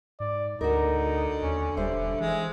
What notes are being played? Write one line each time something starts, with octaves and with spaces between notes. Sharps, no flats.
G#2 D5
D2 D3 D#4 F#4 A#4
D#2 C#4
E1 G3 C5 E5
E3 G#3